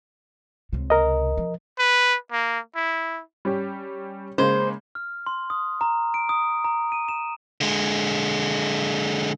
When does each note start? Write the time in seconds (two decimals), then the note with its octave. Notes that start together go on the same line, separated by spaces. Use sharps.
0.73 C#2 C3
0.90 A#4 D#5
1.37 F3
1.79 B4
2.32 A#3
2.76 E4
3.45 G3 C#4 G4
4.38 C#3 G#3 A#3 C5
4.95 F6
5.27 C6
5.50 D#6
5.81 A#5
6.14 D7
6.29 D#6
6.64 A#5
6.92 D#7
7.08 E7
7.61 D3 G#3